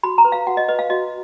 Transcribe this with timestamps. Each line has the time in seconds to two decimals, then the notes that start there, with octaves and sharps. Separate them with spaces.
0.03 F#4 B5
0.18 A#5
0.25 B4
0.32 F5
0.47 F#4 F#5
0.57 D#5
0.68 B4 D#5
0.79 F5
0.90 F#4 D#5